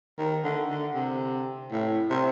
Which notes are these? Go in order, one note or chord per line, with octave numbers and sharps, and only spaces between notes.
D#3
D3
D3
C3
A2
C3